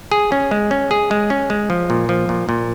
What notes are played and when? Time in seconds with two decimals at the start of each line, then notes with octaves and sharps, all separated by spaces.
0.12 G#4
0.32 C#4
0.51 G#3
0.71 C#4
0.91 G#4
1.11 G#3
1.30 C#4
1.50 G#3
1.70 F3
1.90 A#2
2.09 F3
2.29 A#2
2.49 A#2